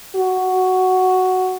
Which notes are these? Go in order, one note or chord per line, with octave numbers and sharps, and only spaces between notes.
F#4